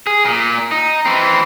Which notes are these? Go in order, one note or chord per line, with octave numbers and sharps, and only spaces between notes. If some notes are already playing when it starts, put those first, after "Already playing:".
G#4
A#2
D#4
E3 C4